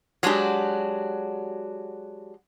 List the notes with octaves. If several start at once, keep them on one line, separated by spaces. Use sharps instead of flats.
F#3 G#3 D4 F#4 G4